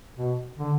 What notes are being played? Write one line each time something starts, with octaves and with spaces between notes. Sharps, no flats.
B2
D3